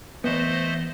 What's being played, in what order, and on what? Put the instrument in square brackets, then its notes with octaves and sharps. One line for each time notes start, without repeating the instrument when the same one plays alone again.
[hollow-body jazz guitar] E2 G#2 B3 [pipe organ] A3 C5 D#5